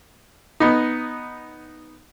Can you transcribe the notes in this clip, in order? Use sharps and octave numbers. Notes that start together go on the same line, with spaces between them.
B3 D#4